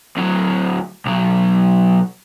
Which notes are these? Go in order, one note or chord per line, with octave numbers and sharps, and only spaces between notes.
D2 F#3
B1 F#3